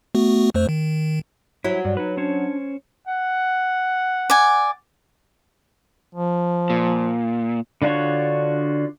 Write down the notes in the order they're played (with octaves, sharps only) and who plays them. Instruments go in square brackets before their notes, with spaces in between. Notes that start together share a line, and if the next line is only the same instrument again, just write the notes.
[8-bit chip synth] A3 B3 F#4
F2 A3 C5
D#3
[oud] F#3 [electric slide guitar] E4
[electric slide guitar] G2 [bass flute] D5
[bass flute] D#4 [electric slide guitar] F#4 B4
[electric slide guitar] C#4 C5 C#5 [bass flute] D4
[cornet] F#5
[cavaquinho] D5 G#5
[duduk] F3
[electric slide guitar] A#2
[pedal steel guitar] D3 D4 F4 F#4 C#5